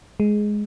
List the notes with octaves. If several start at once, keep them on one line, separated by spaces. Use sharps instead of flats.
G#3